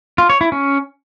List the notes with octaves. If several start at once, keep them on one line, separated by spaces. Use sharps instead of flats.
F4
C#5
E4
C#4